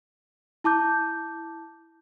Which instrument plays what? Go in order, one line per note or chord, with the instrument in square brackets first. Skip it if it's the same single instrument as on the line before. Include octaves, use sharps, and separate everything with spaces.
[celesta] E4 A5 D6 G6